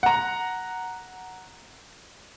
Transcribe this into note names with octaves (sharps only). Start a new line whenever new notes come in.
F#5 A#5